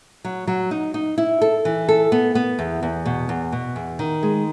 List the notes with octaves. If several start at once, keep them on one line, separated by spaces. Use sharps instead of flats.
F#3
F#3
D#4
D#4
E4
A4
E3
A4
B3
B3
E2
E2
B2
E2
B2
E2
D#3
G#3